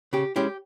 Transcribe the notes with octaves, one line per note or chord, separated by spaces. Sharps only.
C#3 G4
G#3 C#4 E4 G4